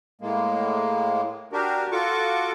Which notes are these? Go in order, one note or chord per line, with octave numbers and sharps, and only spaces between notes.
A2 G#3 A#3
D4 F#4 G4 A#4
F4 F#4 A4 C#6 D6